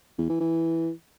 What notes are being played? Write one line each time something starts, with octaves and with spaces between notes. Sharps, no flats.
E2
E3
E3